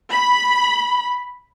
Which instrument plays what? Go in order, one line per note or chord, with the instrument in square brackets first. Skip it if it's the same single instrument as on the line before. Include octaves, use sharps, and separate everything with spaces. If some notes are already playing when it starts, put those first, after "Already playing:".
[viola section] B5